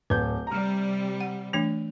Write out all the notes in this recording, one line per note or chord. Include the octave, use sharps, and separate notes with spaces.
D1 B4 G6
C3 G3 A#5 F6
F#5
E3 A3 D4 F7